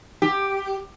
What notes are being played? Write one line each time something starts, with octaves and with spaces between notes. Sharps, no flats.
G4